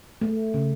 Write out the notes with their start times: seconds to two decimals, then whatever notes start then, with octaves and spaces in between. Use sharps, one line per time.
0.21 A3
0.54 C#3